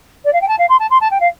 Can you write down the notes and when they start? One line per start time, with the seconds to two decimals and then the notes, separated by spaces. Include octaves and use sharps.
0.25 D5
0.33 F5
0.41 G5
0.48 A5
0.58 F5
0.69 C6
0.79 A5
0.90 C6
1.01 A5
1.11 G5
1.20 F5